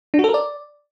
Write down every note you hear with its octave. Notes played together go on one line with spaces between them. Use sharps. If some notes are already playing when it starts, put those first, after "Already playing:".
D4
F#4
A4
A#4
D5